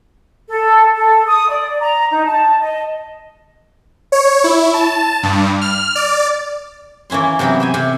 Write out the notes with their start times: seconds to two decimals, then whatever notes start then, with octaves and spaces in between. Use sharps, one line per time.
0.49 A4
0.95 A4
1.27 D#6
1.49 D5
1.80 A#5
2.11 D#4
2.25 A5
2.61 D#5
4.12 C#5
4.44 E4
4.74 A5
5.23 G2
5.61 F6
5.95 D5
7.10 E3 A#3 C#4 E4 C6
7.39 C3 E3 F#3 B3 B5
7.60 C5 G5 G#5
7.74 C3